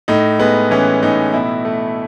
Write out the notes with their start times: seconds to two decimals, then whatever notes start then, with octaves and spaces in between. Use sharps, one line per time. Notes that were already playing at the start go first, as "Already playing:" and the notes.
0.08 A2 D#4
0.39 G#3 B3
0.71 E3 C#4
1.03 A2 D#4
1.33 B2 E4
1.65 A3